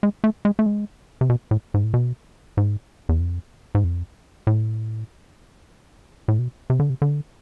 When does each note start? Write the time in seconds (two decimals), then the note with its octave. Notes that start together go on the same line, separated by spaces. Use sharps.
0.03 G#3
0.24 A3
0.45 G#3
0.59 A3
0.66 G#3
1.21 C3
1.30 B2
1.51 A2
1.74 G#2
1.84 A2
1.94 B2
2.57 G#2
3.09 E2
3.20 F2
3.75 G#2
3.84 F2
4.47 A2
6.28 A2
6.39 B2
6.70 C3
6.80 D3
6.90 C3
7.02 D3